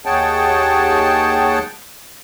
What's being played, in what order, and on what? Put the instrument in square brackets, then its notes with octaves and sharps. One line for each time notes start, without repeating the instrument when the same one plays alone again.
[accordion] D#2 G#4 C#5 F#5 G5 A5